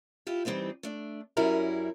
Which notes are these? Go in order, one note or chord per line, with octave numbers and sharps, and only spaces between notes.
E4 F4 G4
E3 G3 C4 D#4 C5
A3 D4
F#2 G3 C#4 E4 F#4 A#4